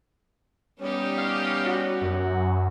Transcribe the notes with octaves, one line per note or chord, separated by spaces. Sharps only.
G3 B3 C#4 D#4 G4
F5
F#4
F#2